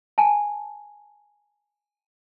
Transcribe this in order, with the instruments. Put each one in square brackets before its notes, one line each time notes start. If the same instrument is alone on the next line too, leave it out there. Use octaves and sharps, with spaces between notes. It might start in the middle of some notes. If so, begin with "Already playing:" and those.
[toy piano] G#5 A5